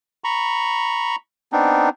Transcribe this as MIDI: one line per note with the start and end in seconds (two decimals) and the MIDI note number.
0.24 1.16 82
0.24 1.16 83
0.24 1.16 85
1.53 1.89 59
1.53 1.89 60
1.53 1.89 62
1.53 1.89 63